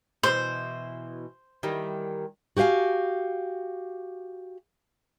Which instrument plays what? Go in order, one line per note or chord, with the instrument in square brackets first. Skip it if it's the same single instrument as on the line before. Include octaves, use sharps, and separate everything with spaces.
[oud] B2 E3 [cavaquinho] C5
[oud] D#3 E3 G3
[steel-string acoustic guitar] F#4 G4 B4 F5 G#5